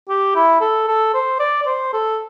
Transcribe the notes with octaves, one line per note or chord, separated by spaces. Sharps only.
G4
E4
A4
A4
C5
D5
D5
C5
A4